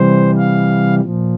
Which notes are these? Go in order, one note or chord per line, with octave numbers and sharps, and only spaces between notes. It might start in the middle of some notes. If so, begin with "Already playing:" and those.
Already playing: C3 E3 G3 C5
F5
A#2 F3